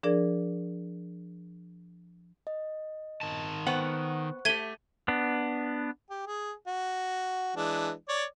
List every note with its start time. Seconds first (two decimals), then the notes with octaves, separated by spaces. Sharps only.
0.03 F3 D4 G#4 A#4 D5
2.47 D#5
3.21 D#3 A5
3.66 B3 C5 F#5 G5 C#6 F#6
4.45 A3 G4 G#6 D#7 G7
5.08 B3 D4
6.10 G4
6.27 G#4
6.67 F#4
7.56 E3 G#3 D4
8.09 C#5 D5